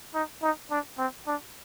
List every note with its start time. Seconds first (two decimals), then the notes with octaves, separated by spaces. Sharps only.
0.14 D#4
0.42 D#4
0.70 D4
0.98 C4
1.27 D4